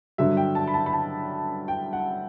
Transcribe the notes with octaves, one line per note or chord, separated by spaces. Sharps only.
G2 D3 F#3 E5
G5
A5
B5
A5
B5
A5
G5
F#5